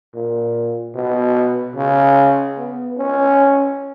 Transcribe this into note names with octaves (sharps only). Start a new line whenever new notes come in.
A#2
B2
C#3
B3
C#4